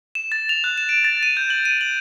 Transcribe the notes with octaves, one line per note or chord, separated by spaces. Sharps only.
E7
A6
F7
F#6
E7
D7
A6
D#7
G6
F#7
D#7
F#7